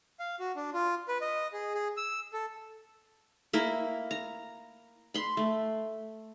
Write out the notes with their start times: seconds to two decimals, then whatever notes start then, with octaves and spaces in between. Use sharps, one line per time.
0.20 F5
0.40 F#4
0.56 D4
0.74 F4
1.08 B4
1.21 D#5
1.53 G#4
1.75 G#4
1.97 E6
2.33 A4
3.53 A#3 E4 A#4
4.11 A#5
5.14 B5 C6
5.37 A3